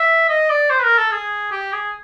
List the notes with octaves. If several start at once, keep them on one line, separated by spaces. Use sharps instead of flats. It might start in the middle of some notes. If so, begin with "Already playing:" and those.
Already playing: E5
D#5
D5
C5
B4
A#4
A4
G#4
G4
G#4